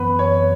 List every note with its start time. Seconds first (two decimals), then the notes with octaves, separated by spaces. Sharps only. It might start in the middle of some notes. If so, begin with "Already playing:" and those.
Already playing: F#2 E3 B3 B4
0.19 C#5